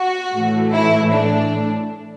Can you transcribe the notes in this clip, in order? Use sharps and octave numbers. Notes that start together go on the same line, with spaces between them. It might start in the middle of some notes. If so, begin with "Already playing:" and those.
Already playing: F#4
A2 E3 A3
E4
D4